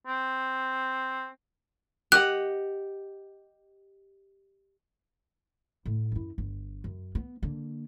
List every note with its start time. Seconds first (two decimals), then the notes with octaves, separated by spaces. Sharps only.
0.07 C4
2.12 G4 D#5 F#5 F#6
5.86 A2
6.12 F#2 E4
6.38 G1
6.84 F#2
7.15 B3
7.42 D3 A#3